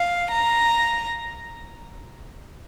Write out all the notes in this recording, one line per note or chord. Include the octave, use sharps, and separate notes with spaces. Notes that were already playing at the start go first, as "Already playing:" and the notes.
Already playing: F5
A#5